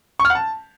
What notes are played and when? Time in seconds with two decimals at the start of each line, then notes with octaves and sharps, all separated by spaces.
0.20 C#6
0.25 F6
0.30 F#5
0.35 A5